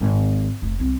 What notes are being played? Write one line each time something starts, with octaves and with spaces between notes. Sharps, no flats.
G#1
F1 A3
C2 C4